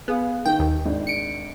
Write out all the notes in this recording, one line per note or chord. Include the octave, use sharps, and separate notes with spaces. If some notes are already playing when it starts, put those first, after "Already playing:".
B3 G#4 F5
D#3 G5
D#2
G#1 D4
C#7 D7